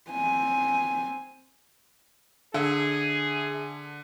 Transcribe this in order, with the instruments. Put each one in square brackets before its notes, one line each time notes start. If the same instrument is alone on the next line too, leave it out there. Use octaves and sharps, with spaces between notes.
[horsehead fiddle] C4 G#5
[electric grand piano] D3 [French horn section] G#4 [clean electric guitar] E5